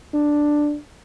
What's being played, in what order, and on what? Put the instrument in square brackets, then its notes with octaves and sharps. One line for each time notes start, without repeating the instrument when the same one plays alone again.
[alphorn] D4